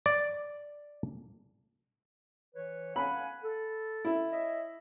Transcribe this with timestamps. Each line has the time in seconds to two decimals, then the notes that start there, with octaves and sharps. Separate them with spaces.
0.06 D5
2.55 E3 B4 C#5
2.96 F5 F#5 G#5 B5
3.43 A4
4.05 E4
4.32 C#5 D#5 E5